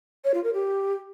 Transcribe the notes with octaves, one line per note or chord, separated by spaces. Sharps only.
C#5
F4
A#4
G4